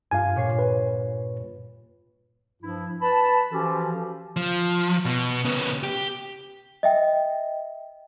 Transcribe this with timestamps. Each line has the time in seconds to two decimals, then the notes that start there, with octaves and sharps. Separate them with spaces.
0.11 G2 F4 F5 G#5
0.36 A#2 C#5 C7
0.59 B4
2.62 G2 F3 E4
3.01 B4 A5 B5
3.51 E3 F3 C#4 F#4 G4 A4
4.36 F3
5.05 B2
5.45 C#3 B3
5.83 G4
6.83 D#5 E5 G5